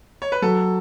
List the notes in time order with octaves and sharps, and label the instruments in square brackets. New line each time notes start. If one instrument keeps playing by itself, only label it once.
[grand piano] C#5
B4
[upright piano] F#3 [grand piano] A4